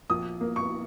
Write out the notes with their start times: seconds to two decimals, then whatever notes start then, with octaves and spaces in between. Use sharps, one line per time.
0.10 A#1 D#6
0.41 A#3
0.56 C#6